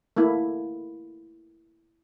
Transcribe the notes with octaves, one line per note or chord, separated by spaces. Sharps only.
A3 A#3 E4